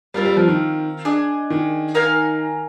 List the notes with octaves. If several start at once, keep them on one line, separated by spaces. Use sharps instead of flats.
G3 C4 F4 A#4 F5
G3
F3
D#3
D4 G#4 D#5
D#3
D#4 A#4 F5 G#5